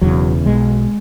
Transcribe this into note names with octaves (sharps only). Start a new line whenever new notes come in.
E1 E2 C#3 F#3
B1 B2 G#3